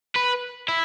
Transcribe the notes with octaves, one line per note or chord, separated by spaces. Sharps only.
B4
E4